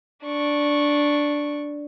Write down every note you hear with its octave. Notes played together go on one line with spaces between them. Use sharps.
D4 C#6